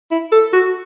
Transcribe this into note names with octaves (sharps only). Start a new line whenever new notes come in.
E4
A4
F#4